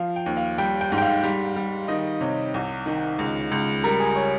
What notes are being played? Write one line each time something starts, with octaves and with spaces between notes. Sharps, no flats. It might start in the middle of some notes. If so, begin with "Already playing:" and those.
Already playing: F3 F5
G5
D#2
F5
G3 G5
G5
G#2
G5
F5
G3
G3
D#3 D#5
C3 C#5
C2
D#3
C#2
C#2
G3 A#4
G#4
C#5